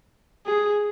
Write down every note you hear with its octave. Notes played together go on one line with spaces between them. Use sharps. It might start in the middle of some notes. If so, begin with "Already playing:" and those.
G#4